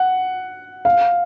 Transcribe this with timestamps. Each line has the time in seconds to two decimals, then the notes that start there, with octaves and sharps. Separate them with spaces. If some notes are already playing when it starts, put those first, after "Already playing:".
Already playing: F#5
0.85 F5